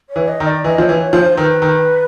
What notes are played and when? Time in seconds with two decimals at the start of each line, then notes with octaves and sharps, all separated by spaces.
0.10 C#5
0.16 E3
0.28 D#5
0.40 D#3
0.46 D5
0.64 E3 D#5
0.78 F3 C#5
0.89 E3
1.01 C#5
1.13 F3
1.19 C5
1.37 D#3 B4
1.62 D#3